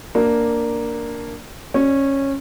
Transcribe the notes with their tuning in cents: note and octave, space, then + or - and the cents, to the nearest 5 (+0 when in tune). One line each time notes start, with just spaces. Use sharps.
A#3 +0 D4 +0
C#4 -15 D5 +0